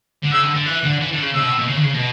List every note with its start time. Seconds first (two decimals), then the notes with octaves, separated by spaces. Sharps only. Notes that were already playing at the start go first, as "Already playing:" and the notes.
0.24 D3
0.32 C#3 E6
0.44 D3
0.55 D3
0.66 E3 F#6
0.84 D3
1.01 E3
1.12 D3
1.22 C#3
1.35 C#3 E6
1.42 B2
1.51 A2
1.59 B2
1.68 C#3
1.76 D3
1.84 C#3
1.94 B2